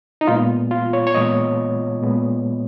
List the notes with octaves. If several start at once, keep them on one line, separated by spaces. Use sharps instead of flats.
D#4
A#2 G#3 B3 F4
F4
C#5
C#5
A#2 G#3 B3 D#5
A#2 G#3 B3